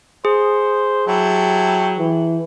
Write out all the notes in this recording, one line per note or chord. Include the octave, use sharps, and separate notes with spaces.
G#4 C5
F#3 E4 G4 A4
E3